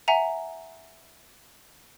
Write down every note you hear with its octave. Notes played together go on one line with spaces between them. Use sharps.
E5 F#5 G#5 A#5